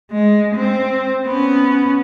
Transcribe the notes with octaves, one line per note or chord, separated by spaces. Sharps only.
G#3
C4
B3 C#4